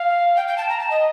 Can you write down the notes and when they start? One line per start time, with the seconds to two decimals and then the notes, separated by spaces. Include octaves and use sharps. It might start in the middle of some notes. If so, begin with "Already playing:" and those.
Already playing: F5
0.36 G5
0.47 G5
0.57 A5
0.69 A#5
0.79 A5
0.90 D#5